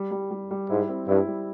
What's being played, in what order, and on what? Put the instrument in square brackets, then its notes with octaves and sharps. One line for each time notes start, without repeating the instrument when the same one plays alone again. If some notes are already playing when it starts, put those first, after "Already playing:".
Already playing: [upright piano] G3
G3
G3
G3
[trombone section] G#2 [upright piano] E4
[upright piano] C4
[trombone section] G2 [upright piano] E4
[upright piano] G3